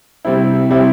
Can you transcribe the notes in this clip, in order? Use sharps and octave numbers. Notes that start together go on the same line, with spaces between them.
C3 G3 C4 E4
C3 G3 C4 E4